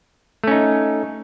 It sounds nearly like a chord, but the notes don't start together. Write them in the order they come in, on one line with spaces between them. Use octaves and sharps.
A3 C#4 D#4